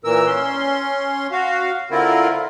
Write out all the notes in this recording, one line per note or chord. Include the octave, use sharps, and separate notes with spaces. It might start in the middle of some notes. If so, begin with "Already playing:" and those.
A#2 E3 A#4 E6
C#4 C6
F#4 F5
D3 C4 E4 F4 A#4